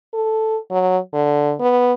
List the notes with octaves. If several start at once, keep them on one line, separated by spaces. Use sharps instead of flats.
A4
F#3
D3
B3